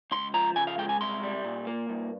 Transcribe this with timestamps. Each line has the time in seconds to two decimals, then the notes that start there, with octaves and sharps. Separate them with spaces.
0.11 C#2 C6
0.34 F3 A#5
0.56 C#3 G#5
0.67 F5
0.78 G#3 G5
0.89 G#5
1.01 C2 C6
1.23 G3
1.44 A#2
1.67 A#3
1.89 G2